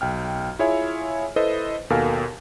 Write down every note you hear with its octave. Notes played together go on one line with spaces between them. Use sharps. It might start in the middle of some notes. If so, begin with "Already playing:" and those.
B1 G5 F6
E4 F4 G#4 C#5 E5 G#5
E4 A4 B4 C5 D#5
D#2 B2 A4 A#4 F5 G#5